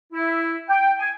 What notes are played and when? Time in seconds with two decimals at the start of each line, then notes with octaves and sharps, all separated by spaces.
0.12 E4
0.68 G5
0.99 G#5